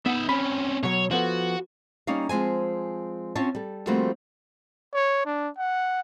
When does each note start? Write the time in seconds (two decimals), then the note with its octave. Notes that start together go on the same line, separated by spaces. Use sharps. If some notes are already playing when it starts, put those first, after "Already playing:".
0.06 B3 D#4 E5
0.29 C4 C#4 B5
0.83 B2 F#3 C#5
1.11 F3 B3 F#4 A4
2.07 G3 A#3 C#4 D#4 F5
2.29 F3 G#3 C4 G#5
3.35 C4 C#4 F4 C#5 A5
3.55 G3 A4
3.87 F3 G3 A3 A#3 C4 F#4
4.94 C#5
5.25 D4
5.58 F#5